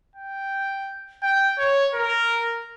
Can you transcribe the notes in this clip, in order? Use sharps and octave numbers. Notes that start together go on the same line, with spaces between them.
G5
G5
C#5
A#4